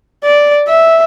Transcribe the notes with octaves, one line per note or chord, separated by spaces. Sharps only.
D5
E5